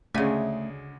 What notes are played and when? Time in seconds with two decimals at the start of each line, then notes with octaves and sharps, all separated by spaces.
0.14 D2 C#3 G#3 A3 G#5